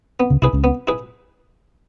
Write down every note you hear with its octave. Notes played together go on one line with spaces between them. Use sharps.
B3
C#2 C#3
C2 C3 E4 G#4 B4
C#2 C#3
B3
E4 G#4 B4